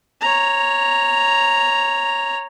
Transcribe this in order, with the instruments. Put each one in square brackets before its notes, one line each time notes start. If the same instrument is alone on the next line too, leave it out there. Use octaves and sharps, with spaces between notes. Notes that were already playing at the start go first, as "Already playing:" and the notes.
[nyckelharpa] C#5 A#5